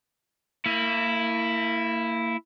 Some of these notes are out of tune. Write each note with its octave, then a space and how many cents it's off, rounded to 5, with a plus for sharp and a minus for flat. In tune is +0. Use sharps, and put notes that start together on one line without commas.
A#3 -35 E4 +0